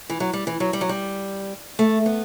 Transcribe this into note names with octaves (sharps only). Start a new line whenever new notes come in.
E3
F#3
G3
E3
F#3
G3
F#3
G3
A3
B3